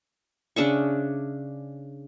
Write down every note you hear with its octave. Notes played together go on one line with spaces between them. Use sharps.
C#3 D4 E5 C#6